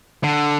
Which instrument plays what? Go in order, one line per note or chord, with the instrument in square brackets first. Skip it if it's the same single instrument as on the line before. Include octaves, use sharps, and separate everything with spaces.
[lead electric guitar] D3